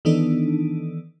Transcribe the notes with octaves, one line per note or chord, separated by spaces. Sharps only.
D#3 E3 B3 D4 D#4 A4